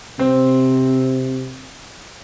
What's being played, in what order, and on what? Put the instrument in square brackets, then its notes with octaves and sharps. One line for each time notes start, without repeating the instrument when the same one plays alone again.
[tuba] C3 [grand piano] C4